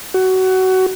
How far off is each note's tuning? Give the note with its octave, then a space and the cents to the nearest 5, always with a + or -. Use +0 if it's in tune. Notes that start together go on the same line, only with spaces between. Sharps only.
F#4 +20